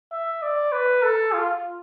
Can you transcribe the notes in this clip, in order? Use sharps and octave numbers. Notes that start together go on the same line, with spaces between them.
E5
D5
B4
A4
F4